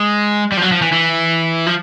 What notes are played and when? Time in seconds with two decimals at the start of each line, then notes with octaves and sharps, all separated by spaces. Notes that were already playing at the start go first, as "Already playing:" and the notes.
Already playing: G#3
0.52 G3
0.57 F3
0.62 F#3
0.72 F3
0.82 E3
0.92 E3
1.67 F3